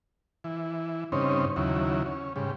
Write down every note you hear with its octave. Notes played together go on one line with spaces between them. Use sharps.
E3
G2 C#3 C4 C#4 D#4
D#2 C#3 F#3 E4
C#4
G#2 C#3 G3